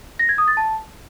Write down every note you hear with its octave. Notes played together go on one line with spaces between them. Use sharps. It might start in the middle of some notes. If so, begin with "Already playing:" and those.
A#6
G#6
D#6
A6
A5